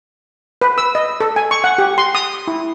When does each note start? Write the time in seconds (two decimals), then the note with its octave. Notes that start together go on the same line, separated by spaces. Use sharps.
0.61 B4
0.78 E6
0.95 D#5
1.20 A4
1.36 G#5
1.51 C#6
1.64 F#5
1.78 G4
1.98 C6
2.15 D#6
2.47 E4